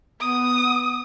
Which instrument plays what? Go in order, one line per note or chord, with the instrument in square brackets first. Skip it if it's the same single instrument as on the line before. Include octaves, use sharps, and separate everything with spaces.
[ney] B3 [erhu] D#6